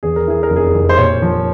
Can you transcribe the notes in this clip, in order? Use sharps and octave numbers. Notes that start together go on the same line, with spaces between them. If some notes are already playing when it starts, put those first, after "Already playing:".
E2 G#4
A#4
E3 G#4
A#4
F1
G#4
F1
C5
A#2 C#5
F3